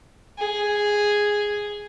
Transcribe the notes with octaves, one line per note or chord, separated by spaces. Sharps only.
G#4